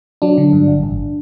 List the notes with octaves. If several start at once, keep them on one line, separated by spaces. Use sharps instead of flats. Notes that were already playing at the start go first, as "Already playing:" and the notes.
F#3 D4
D3
G2
G1
A1